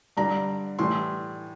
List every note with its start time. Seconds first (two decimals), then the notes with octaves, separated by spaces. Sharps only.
0.17 G2 D3 G3 A#5
0.79 A2 E3 G3 C6